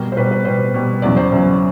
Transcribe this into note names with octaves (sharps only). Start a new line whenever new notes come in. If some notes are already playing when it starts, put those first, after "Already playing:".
Already playing: B2 G3 A#4
C5
B2 G3 B4
B4
B2 G3 C5
B2 G3
E2 C#3 F#3 D5
C5
E2 C#3 F#3